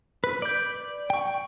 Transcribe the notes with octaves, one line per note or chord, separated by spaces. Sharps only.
B4
D5 G6
G5 C#6